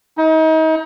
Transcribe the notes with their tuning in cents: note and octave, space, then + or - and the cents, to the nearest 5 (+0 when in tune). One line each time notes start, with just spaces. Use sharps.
D#4 +35